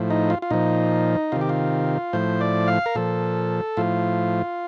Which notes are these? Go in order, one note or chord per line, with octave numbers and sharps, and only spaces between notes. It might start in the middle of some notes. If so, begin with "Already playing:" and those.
Already playing: A2 F3
D#4
F4
F4
A#2 F3 D#4
C3 D#3 F4
G4
F4
A2 F3 C5
D5
F5
A#4
A#2 F3 A4
A2 F3 F4